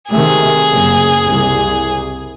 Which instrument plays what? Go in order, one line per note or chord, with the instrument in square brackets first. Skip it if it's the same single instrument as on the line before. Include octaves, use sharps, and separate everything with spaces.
[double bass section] C3 D#3 A3 [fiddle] G#4
[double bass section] F#1
C2